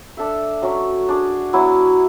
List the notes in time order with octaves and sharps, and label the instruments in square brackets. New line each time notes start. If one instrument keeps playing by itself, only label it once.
[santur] D4 A4 E5
F#3 C#4 F#4
D4 G#4 D5
F#3 B3 E4